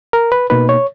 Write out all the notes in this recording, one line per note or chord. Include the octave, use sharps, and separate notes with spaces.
A#4
B4
B2 A#3 D#4 B4
C#5